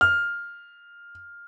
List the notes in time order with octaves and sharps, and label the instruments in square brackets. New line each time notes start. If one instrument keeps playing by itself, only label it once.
[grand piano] F6